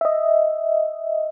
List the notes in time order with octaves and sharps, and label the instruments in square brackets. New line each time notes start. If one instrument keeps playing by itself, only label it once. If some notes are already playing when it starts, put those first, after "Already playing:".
[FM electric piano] D#5 E5